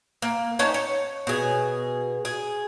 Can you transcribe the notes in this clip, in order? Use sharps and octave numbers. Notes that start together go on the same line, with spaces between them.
A#3
C#4 D#4 A5
C#5
B2 G#4
G#4